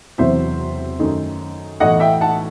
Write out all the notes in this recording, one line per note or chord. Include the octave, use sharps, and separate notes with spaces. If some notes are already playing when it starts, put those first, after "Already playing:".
E1 E2 C3 F#3 C4 C5 E5
F#2 D#3 A3 D#4
B1 A2 E3 A3 D#5 F#5
E5 G5
F#5 A5